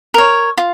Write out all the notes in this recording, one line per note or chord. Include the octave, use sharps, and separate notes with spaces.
A#4 C#5
F4